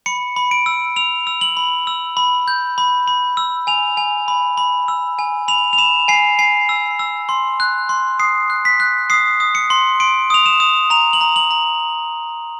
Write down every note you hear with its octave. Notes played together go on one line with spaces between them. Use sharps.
B5 C#7
B5
D7
E6
E6 F7
E6
F#7
B5
E6
B5
G6
B5
B5
E6
G#5 F7
G#5
B5
B5
E6
G#5
B5 F7
F7
B5 E7
G#5 C7
G#5 C7
E6
E6
C6
F#6
C6
D#6 C7
F#6
B6
F#6
D#6 C7
D#6
C#7
C6
C6 D7
D#6 F7
E7
D#6
A#5 F7
F#7
A#5
F#7
A#5